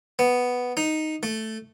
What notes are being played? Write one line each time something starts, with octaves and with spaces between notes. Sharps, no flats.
B3
D#4
A3